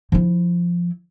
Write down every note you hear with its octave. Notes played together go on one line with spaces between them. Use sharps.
F3 E4